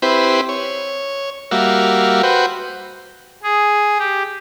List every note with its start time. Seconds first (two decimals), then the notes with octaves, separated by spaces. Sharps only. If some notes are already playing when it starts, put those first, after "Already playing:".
0.02 C4 E4 G4 B4 C5
0.49 C#5
1.51 G3 A#3 F#4 E5 F5
2.23 F#4 B4 C5 G5
3.43 G#4
3.99 G4